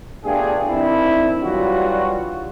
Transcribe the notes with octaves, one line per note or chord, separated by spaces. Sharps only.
A3 B3 D4 F4 G4 G#4
D#3 C4 D4 E4
E3 F#3 G3 D4 F4 F#4